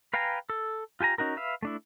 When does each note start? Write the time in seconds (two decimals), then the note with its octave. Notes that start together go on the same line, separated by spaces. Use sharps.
0.14 B4 F5 G5 G#5 A#5
0.50 A4
1.00 F4 G4 G#5 A#5
1.18 C#4 D#4 F#4 A#4
1.37 B4 E5 F5
1.63 A3 D4 E4